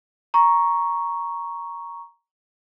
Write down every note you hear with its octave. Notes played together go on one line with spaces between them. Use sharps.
A#5 C#6